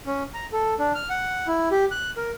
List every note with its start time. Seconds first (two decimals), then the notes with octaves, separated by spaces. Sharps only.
0.07 C#4
0.34 A#5
0.52 A4
0.79 D4
0.95 F6
1.10 F#5
1.47 E4
1.72 G4
1.91 F#6
2.17 A#4